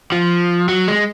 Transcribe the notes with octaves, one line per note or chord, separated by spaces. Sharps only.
F3
F#3
G#3